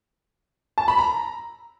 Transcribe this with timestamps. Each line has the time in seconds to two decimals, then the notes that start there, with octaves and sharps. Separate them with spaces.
0.78 A5
0.88 B5
0.98 A#5